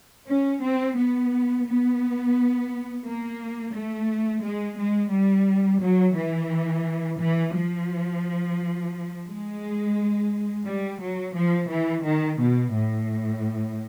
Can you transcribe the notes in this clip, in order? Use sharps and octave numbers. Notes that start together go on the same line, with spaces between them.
C#4
C4
B3
B3
A#3
A3
G#3
G#3
G3
F#3
E3
E3
F3
G#3
G3
F#3
F3
E3
D#3
B2
A2